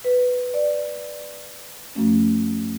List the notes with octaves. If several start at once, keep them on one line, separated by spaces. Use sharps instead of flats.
B4
D5
F#2 F3 A3 C#4